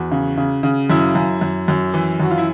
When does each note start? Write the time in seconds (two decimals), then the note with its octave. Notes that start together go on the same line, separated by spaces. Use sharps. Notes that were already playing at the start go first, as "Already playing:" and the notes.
Already playing: E2 F#4
0.11 C#3
0.37 C#3
0.63 C#3
0.90 F#2 E4
1.15 F#2
1.41 F#2
1.68 F#2
1.94 E3
2.20 F#2 F#4
2.31 F4
2.38 E4